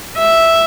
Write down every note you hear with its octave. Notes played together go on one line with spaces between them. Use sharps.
E5